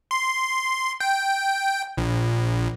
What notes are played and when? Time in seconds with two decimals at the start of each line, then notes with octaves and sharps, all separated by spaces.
0.11 C6
1.00 G5
1.98 A#1